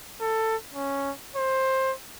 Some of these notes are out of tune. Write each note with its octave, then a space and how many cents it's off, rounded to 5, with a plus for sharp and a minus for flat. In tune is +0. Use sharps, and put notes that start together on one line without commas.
A4 +15
C#4 +0
C5 +15